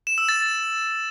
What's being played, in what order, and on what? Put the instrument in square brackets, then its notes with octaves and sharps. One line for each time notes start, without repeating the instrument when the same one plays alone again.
[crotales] E7
E6
A6